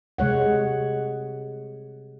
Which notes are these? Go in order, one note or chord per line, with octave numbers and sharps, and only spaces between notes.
C3 G#3 C#5 F#5